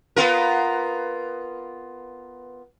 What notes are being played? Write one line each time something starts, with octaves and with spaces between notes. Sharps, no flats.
B3 F4 A#4